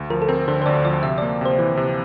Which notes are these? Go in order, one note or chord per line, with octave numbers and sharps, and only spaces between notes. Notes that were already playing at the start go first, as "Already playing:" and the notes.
Already playing: D2
F3 A#4
A4
C4 A#4
D3 C5
C5
D2 D5
F3 D5
C3 E5
A#3 D5
C3 C5
E3
C3